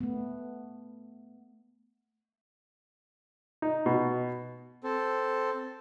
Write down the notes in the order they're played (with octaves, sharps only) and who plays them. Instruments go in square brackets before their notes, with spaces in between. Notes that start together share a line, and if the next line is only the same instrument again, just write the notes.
[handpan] A3 B3
[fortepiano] D#4
B2
[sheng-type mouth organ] C4 A4